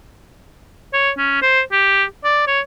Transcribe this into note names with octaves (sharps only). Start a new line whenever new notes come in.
C#5
C#4
C5
G4
D5
C#5